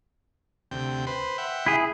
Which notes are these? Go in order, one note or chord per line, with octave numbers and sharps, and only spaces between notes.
D2 C3 G5
B4 C5
E5 F#5 G5
E4 G#4